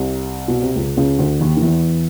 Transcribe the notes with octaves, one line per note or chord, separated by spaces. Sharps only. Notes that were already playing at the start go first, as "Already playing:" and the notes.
Already playing: C2 C3
B2
C3
C#2 C#3
C#2 C#3
D2 D3
D#2 D#3
D#3
E2 E3